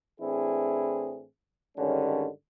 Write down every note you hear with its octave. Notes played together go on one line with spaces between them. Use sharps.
A2 E3 C4 D4 E4 G#4
G2 D3 D#3 G#3 C#4